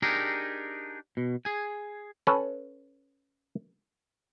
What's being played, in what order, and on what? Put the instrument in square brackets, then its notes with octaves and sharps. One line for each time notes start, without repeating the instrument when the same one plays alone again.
[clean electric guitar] D4 D#4 G4 G#4 A#4
B2
G#4 G#5
[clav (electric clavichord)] C#4 A4 B4